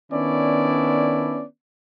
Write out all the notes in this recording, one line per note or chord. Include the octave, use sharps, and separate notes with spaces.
D#3 B3 C#4 D4 E4 D5